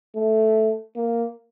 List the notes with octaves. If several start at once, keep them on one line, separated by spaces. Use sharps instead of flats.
A3
A#3